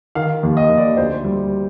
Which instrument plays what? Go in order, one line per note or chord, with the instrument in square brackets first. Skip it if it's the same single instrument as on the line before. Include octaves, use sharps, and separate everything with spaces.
[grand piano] D#3 F5
D#2
D#5
D#2
D5
D2 C5
G3